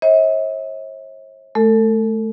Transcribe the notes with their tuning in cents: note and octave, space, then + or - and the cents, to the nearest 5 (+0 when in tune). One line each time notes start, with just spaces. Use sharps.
C#5 -45 E5 -45
A3 -25 A4 +35